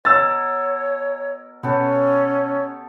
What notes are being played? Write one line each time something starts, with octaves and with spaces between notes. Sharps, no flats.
B2 A#4 C#5 E6 A6
B2 B3 C#4 G4 A4